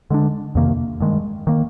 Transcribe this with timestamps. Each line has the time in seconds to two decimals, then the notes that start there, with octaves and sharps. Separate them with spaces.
0.10 D3 G#3 D4
0.55 F2 C3 D#3 A#3
1.00 G2 D#3 G#3
1.47 D#3 A#3